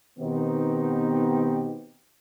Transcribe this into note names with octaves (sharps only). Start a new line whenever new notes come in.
B2 D#3 B3 C4 D#4 G4